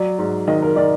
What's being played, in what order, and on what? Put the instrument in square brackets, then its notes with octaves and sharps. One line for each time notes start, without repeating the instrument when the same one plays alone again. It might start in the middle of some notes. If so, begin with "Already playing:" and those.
Already playing: [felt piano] F#3 [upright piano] D5
[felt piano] G#2
[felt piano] D#3 [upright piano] D#5
[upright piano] A#4
[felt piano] D#3 [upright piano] D5